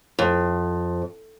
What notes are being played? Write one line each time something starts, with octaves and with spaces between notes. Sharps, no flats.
F2